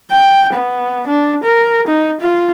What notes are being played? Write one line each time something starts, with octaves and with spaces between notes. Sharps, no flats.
G5
B3
D4
A#4
D#4
F4